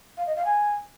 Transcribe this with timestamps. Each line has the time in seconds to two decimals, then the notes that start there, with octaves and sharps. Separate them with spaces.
0.18 F5
0.27 D#5
0.36 F5
0.45 G#5